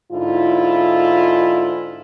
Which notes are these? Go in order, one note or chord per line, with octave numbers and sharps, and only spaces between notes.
G#2 D3 E4 F4